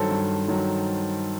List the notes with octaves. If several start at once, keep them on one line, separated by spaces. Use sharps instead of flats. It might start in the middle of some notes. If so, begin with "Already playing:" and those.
Already playing: G2 D#3 F#3 A4 C5
G2
D#3 F#3